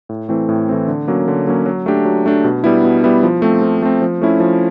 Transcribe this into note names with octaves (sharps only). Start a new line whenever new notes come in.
A2
E3 A3 C4
A2
E3 A3 C4
D3
F#3 A#3 C#4
D3
F#3 A#3 C#4
F#3
A3 D4 G4
F#3
A3 D4 G4
B2
G3 B3 E4
B2
G3 B3 E4
F3
A3 C4
F3
A3 C4
F3
A3 C#4 E4
F3